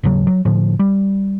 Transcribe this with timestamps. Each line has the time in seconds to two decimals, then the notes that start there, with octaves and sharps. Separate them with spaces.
0.03 G#1 D#2 C#3 F#3
0.27 F#3
0.45 A2 D3 F3
0.79 G3